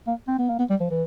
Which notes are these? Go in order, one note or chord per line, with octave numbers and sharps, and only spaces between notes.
A#3
C4
B3
A#3
B3
G3
F3
E3